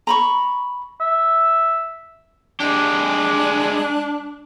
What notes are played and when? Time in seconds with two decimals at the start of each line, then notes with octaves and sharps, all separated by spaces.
0.07 A#5 B5 C#6
1.01 E5
2.60 G#3 D4 G4